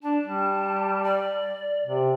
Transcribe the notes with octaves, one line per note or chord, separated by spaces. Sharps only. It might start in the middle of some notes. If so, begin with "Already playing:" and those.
D4 A5
G3
D5
C3